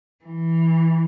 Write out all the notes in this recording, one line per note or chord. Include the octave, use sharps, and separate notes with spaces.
E3